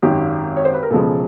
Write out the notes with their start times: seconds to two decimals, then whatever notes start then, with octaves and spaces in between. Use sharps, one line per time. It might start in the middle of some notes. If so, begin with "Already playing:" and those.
0.02 G#1 F#2 D#3 G4
0.57 C#5
0.65 C5
0.73 B4
0.83 A#4
0.90 E1 E2 C#3 F3 G#3 A4